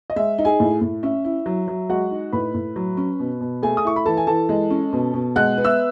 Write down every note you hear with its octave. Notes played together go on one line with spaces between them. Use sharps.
D#5
G#3 E5
D#4
G#4 G#5
A2
A2
C#4 E5
E4
F#3
F#3
G#3 F#4 F#5
D#4
A2 B4 B5
A2
F#3
C#4
B2
B2
A3 G#4 G#5
D#6
E4 C#6
B5
E3 A4 A5
G#5
E3 A4 A5
G#3
C#4
B2
B2
G#3 F#5 F#6
B3
E5 E6